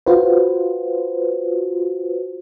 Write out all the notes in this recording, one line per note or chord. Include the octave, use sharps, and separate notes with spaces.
F4 F#4 B4 C5